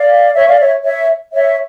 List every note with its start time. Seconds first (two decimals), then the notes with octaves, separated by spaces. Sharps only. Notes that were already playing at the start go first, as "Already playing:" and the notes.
Already playing: D5 F5
0.35 C#5 E5
0.48 D5 F5
0.59 C#5 E5
0.84 C#5 E5
1.33 C#5 E5